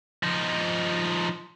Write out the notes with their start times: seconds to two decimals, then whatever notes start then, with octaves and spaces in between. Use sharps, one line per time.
0.23 F3 D#4